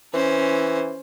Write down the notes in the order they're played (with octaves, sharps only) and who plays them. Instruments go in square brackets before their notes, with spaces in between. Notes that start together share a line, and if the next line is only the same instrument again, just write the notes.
[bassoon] E3 [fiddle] C#4 C5